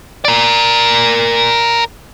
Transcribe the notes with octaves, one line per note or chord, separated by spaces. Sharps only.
A#4 D5